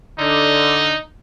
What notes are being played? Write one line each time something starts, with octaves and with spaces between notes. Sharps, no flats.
D3 D#4